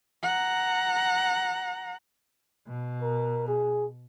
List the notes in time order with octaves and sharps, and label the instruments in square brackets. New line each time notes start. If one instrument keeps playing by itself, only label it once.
[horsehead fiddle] F#5 A#5
[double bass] B2
[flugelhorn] A#4
G#4